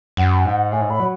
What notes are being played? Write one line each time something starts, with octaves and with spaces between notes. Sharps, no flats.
F#2 F#5
G#2
A2 G#5
G#2
A2 B5
F#3